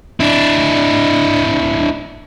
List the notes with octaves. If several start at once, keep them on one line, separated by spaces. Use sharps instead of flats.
D4 E4